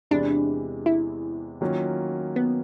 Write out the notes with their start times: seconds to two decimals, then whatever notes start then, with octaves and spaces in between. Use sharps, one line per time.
0.11 E2 C3 E3 G#3 D4
0.86 E4
1.61 D#3 F#3 A#3 C#4 F4
2.36 B3